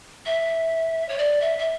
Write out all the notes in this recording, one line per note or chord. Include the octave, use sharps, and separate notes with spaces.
E5
C#5
D5
E5
E5